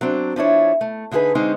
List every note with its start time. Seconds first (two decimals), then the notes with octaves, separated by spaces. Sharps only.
0.01 F#3 C4 D4
0.36 F3 D4 E4 C#5
0.81 A3
1.11 D3 D#4 E4 G#4 B4
1.35 D3 G#3 C4 C#4 D#4